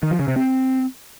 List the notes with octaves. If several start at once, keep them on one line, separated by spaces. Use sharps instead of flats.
D#3
F3
C#3
C3
C4